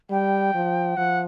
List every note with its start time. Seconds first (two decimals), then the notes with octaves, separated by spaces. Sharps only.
0.10 G3 G5
0.55 F3
0.97 F3 F#5